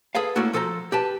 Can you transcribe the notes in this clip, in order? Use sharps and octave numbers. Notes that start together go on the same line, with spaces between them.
G#4 A4 B4 F5
A3 A#3 C#4 E4 F#4 A4
F3 A4 C5 G#5 A#5
G4 B4 A5